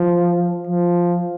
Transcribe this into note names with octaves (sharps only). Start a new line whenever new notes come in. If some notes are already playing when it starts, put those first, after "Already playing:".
Already playing: F3
F3